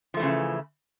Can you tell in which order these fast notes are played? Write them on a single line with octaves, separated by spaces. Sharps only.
F3 A3 E3 C#3